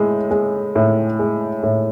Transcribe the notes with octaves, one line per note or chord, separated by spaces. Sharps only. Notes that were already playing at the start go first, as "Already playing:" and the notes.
Already playing: A2 G#3
G#3
A2
G#3
A2